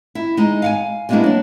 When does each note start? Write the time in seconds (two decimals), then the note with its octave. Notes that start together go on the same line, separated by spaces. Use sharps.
0.15 E4
0.37 G#3 D#4
0.62 F5 F#5 G#5
1.09 G3 G#3 A#3 B3 D4 E4
1.24 F#3 D4